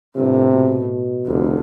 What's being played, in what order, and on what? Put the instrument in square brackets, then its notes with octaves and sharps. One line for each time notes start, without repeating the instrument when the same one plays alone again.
[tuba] G1 [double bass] A2 [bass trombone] C3
[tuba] B2
[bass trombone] F1 [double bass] D2